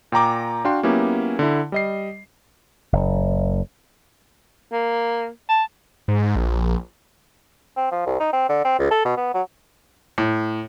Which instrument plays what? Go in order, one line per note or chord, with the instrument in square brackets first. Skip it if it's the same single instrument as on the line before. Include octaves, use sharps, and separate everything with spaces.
[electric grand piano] A#2 G5 A#5 D6
D4 F#4 F5 G5 C6
F#3 A#3 B3 C#4 E4 G4
D3 E4
G3 D#5 C7
[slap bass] F#1
[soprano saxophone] A#3
A5
[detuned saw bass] G#2
A#1
[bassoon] C4
F3
C2
D#4
C4
D3
C4
C#2
A4
B2
B3
F#3
[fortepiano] A2